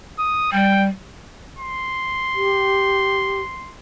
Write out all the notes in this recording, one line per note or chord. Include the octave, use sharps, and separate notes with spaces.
D#6
G3 G5
C6
G4